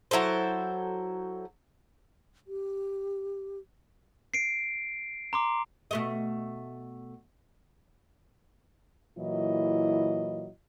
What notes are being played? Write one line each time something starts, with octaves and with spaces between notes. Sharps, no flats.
F#3 E4 A4 C5
G4
C7 D7
A#5 C6 D6
B2 A3 D#5
A#2 E3 F#3 E4 D#5